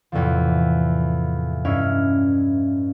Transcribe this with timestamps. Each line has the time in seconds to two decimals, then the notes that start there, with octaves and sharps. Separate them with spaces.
0.12 E2 A2 C3 F3
1.65 G2 C#4 D#4 E4 F6